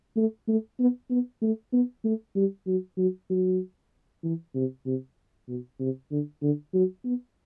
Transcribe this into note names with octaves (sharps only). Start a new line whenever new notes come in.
A3
A3
B3
B3
A3
B3
A3
G3
F#3
F#3
F#3
E3
C3
C3
B2
C3
D3
D3
F#3
B3